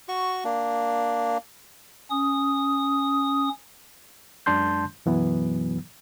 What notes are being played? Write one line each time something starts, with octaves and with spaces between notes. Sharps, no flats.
F#4 C#6
A#3 D4
C#4 D#6
F#2 G#3 D4 A5 C6 G6
F#2 B2 E3 F#3 B3